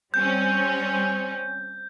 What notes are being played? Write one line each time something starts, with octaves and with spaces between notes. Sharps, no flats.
G3 C4 C#4 G6